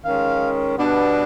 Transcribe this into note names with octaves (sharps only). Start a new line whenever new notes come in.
D#3 G#3 C#4 F5
B2 G3 B3 D4